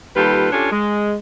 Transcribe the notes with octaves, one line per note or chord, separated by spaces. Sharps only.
D#2 G3 F4 A4 B4
C#4 D4 F4 G4 A4 C#5
G#3